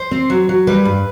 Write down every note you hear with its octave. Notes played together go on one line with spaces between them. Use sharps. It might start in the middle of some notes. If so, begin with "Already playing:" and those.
Already playing: C5
C4
F#3
F#3
G3 B4
G2